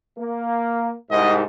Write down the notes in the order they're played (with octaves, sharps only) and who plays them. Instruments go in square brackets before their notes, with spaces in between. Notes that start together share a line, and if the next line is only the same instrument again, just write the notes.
[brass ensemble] A#3
[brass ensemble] C2 G#2 [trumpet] D#5